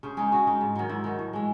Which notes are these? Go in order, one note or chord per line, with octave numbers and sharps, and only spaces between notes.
C#3 C5
G#3 D#4 G#4
C#3 F#4
G#3 D#4
G#2
D#3 F#3
G#2 E4
D#3 F#3
A2
E3 G#3